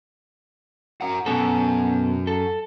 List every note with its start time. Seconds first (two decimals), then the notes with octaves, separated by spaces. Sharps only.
1.01 F#4 A#4
1.26 F#2 B2 B3 A4
2.27 A4